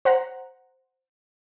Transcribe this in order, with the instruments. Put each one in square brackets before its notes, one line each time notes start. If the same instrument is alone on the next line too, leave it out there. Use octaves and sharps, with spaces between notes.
[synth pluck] C5 F#5 A#5